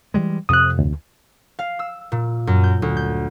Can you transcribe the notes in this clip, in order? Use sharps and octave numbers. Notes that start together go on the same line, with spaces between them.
E3 G3 G#3
F2 C3 D#6 F#6
D2
F5
E6
A#2
F#2
G6
D2
G6